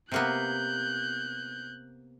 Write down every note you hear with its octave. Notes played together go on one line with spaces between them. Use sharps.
C3 A#3 B3 F#6 G6